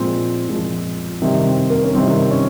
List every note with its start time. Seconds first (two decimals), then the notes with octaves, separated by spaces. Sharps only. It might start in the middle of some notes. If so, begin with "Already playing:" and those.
Already playing: A#2 F3 G#3 C4
0.48 A#2 F3 G#3
1.22 C3 D#3 G3 C4
1.46 C4
1.70 A#3
1.83 C#4
1.95 C3 D#3 G3 C4
2.31 C#4